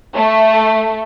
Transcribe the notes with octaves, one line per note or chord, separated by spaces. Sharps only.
A3